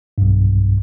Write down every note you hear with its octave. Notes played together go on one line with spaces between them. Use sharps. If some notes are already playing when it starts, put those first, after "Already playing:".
B1 G2